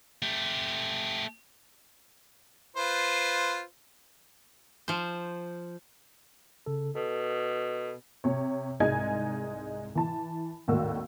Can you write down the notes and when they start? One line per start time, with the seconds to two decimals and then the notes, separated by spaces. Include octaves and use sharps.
0.22 A3 G4
2.76 F4 B4 C5
4.88 F3 C5
6.66 C#3 A4
6.95 B2 A4
8.24 C3 C#5
8.80 C2 G#2 G#3 D#4 G#5 G#6
9.95 E3 A5
10.68 G#1 D#2 A2 D#3 F#4 E6